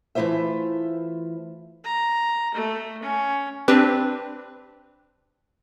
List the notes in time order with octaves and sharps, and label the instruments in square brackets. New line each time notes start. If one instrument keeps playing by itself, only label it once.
[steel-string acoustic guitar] E3 A3 E4 F4 C5 E5
[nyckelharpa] A#5
A3
C#4
[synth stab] C4 D4 G4 B4